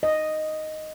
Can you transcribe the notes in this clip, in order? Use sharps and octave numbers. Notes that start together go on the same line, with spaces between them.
D#5